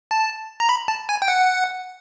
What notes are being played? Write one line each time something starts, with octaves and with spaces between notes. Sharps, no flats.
A5
A#5
B5
A5
G#5
G5
F#5